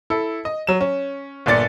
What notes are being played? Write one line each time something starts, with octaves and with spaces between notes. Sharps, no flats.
E4 A4
D#5
F#3 E7
C#4
G1 A#2 D5 A6 C#7